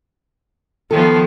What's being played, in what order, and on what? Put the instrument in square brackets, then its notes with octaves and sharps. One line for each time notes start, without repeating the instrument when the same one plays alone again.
[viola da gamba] D#3 F3 B3 [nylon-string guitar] A4